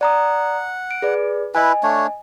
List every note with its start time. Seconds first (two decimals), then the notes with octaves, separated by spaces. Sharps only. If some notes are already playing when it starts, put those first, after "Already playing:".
0.01 D5 F#5 A#5 D#6
0.91 D7
1.02 G#4 B4 D5
1.55 E4 B4 D#5 G#5
1.83 A3 D4 C#5